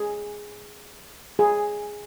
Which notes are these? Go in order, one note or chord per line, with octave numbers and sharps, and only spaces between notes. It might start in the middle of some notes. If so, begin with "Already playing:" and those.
Already playing: G#4
G#4